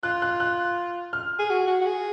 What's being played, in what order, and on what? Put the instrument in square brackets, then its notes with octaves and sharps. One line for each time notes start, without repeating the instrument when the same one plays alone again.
[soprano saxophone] F4 [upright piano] F#6
[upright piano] F#6
F#6
F6
[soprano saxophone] G#4
F#4
F#4
F#4
G#4